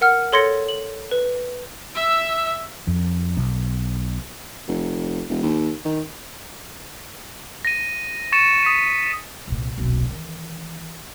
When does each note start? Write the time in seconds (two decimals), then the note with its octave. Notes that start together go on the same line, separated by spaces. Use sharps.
0.01 A#4 F#5 F6
0.33 A4 C#5 C6 A6 A#6 C#7
0.69 F#7
1.11 B4
1.95 E5 E6
2.87 F2
3.37 B1
4.68 F1
5.29 E1
5.43 D#2
5.85 D#3
7.65 A#6 D#7
8.32 C#6 A6 C#7 E7
8.63 D#6 B6 D#7
9.48 C2 A#2
9.77 D#1 B1
10.09 D#3 E3